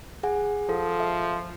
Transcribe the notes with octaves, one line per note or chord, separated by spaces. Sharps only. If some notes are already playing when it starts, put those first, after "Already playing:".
G#4 F#5 G#5
F3 A4
E5